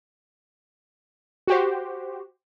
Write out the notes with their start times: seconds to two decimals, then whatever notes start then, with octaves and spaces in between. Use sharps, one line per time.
1.47 F#4 G4 C5